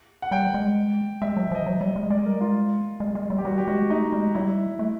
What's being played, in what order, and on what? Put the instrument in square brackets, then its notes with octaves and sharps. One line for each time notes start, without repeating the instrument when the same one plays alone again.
[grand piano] F#5
[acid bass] G3 [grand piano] G5
[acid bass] G#3
[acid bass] G#3 [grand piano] E5
[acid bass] F#3
[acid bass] F3 [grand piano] D#5
[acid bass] F#3
G3
G#3
[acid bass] G#3 [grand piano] D5
[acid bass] G3 [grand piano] A#4
[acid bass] G#3 [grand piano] F4
[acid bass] G#3
G#3
G3
[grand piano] G4
[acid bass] G3 [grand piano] F#4
[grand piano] G4
[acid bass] G#3 [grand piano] F#4
[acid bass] A3 [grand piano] D#4
[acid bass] G#3
[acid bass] G3 [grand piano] E4
[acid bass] A3